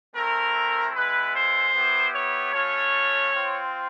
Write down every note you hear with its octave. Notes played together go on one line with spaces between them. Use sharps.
A3 C4 E4 A#4
G#3 B3 E4 B4
C5
B3 E4 G4
C#5
A3 C#4 F4 C#5
C4 F4